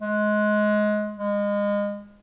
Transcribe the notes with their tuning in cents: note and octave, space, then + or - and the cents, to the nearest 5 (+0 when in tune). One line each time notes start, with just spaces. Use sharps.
G#3 +20
G#3 -30